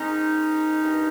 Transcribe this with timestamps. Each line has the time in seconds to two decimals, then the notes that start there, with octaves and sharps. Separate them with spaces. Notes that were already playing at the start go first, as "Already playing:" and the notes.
Already playing: G#2 D#3 C#4 D#4
0.82 G2 D#3